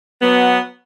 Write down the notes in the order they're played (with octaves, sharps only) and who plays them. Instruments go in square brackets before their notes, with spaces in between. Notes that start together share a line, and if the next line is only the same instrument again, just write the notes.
[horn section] F#3 B3